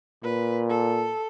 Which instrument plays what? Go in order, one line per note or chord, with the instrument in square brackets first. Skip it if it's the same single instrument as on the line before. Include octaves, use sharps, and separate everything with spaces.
[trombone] A#2 [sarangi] B4
[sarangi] A4